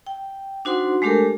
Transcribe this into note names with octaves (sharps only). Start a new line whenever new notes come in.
G5
D4 D#4 F#4 C5 F#5 C6
G#3 A3 D4 G4 A4 A#4